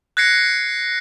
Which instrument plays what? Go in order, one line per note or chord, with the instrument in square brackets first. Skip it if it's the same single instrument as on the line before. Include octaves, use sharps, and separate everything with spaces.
[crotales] F#6 G#6 A#6 C7 C#7